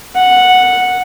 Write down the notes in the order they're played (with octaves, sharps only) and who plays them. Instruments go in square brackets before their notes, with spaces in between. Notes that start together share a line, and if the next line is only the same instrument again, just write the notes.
[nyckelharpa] F#5